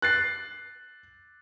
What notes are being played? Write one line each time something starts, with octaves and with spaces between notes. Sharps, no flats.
F#6 A6 C7